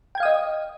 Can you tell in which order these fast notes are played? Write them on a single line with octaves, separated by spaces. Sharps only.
G5 G#6 F5 D#6 D#5